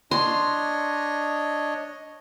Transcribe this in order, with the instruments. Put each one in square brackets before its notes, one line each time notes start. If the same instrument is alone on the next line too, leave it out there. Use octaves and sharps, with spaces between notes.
[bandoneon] D4 C#5 D#5 [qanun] C6